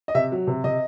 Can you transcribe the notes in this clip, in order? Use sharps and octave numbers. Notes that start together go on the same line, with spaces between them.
D#5
C3 E5
F#3
C3
C3 D#5